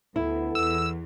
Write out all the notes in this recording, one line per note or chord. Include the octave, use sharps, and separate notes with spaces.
D2 B3 E4 A4
E2 E6